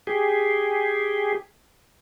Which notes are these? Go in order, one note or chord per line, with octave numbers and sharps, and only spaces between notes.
G4 G#4